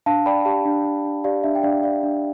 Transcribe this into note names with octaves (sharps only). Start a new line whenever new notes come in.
D4 F5 A5
D5 G5 B5
G4 F5 A5
D4
D4
D4
G4 D5 F5
D4 E5
G5
D4 D5 F5
D5 F5
D4